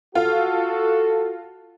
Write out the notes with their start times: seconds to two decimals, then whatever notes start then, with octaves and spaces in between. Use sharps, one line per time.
0.15 F4 F#4 A4